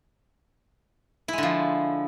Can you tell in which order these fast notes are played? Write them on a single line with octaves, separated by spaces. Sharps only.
E4 G#3 D3 F3